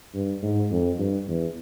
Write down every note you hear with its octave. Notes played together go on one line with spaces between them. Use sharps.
G2
G#2
F2
G2
E2